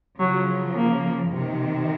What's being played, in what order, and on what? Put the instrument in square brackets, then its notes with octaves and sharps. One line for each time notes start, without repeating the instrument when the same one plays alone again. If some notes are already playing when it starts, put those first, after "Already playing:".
[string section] C#3 F3 [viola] F#3
[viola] A#3
[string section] C3 D#3